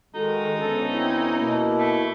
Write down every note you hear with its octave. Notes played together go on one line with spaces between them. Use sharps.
D#3 G#3 D#4 F#4 A4
D2 B3 C#4 A4
C4 E4
B2 A#3
A3